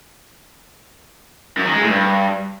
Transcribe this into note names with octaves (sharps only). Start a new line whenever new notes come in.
F#2
D#3
G#3
A2
G2